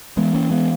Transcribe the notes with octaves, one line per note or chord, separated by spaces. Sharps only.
E3 G#3 B3
A#3 C#4
G#3 B3